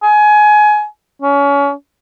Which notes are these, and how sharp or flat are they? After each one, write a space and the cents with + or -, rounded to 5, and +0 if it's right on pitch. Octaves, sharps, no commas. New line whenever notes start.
G#5 +20
C#4 +30